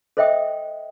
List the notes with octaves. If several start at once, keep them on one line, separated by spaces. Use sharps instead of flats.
A4 C5 D#5 E5 G5 D#6